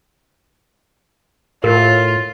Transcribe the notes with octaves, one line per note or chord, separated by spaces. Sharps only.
A2 F4 A#4